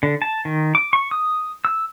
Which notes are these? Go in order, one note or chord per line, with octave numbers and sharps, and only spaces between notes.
D3
A5
D#3
D6
C#6
D#6
E6